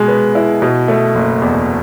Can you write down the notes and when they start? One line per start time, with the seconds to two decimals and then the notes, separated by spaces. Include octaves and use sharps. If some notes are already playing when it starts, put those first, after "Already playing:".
Already playing: B2 G#3
0.08 B3
0.35 E4
0.62 B2
0.88 A3
1.15 F#1
1.42 E2